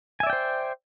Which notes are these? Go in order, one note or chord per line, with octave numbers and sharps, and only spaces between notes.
C5 D5 E5 G5 G#5